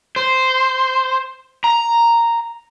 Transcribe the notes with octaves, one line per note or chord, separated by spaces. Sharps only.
C5
A#5